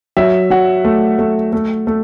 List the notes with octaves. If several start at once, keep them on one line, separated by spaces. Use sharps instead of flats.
F#3 E5
F#3 F#5
A3
A3
A3
A3